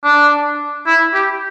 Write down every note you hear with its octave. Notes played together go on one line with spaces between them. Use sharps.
D4
E4
G4